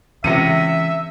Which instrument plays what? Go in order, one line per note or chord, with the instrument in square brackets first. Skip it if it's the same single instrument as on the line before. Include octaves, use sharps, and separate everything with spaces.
[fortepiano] C#2 C3 [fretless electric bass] E3 C#4 [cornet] E5 [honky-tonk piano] A#6 C#7 D#7